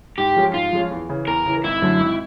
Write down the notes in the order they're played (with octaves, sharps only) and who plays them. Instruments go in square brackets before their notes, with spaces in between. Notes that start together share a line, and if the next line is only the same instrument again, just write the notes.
[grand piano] G#2 [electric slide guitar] G4
[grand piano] F3 G#3 C#4
[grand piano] G#2 [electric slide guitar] F4
[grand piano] F3 G#3 C#4
E2
C#3 E3
[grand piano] E2 [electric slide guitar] A#4
[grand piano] C#3 E3
[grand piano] G#1 [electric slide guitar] E4
[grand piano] F#2 D3 F#3 A3
G#1